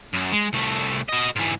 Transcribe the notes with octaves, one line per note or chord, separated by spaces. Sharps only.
F#2
G#3
C2 A3
F#4 D#5
G#2 E3